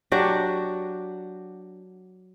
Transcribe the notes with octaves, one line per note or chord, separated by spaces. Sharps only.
F#3 D4 F#4 G4